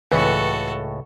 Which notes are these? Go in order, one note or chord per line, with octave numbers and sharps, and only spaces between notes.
C#2 A2 E3 F#4 A4 F#5